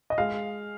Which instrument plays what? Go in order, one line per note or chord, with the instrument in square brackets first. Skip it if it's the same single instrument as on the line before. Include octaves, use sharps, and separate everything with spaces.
[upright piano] D#5
G#3 F5